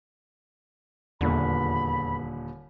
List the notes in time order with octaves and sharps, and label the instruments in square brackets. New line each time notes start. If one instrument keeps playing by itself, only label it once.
[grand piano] D#1 A#2 D3 [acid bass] E2 [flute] B5